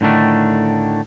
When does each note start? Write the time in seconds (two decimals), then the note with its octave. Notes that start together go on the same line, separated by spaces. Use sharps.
0.01 A2 D3 D#3 A3 D4